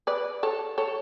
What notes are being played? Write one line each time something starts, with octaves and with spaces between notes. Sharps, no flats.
B4 D5
A4 C#5
A4 C#5